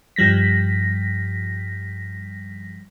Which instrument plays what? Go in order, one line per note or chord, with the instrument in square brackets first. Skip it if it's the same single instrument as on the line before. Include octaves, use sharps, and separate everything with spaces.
[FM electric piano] G2 F3 G3 A#6 B6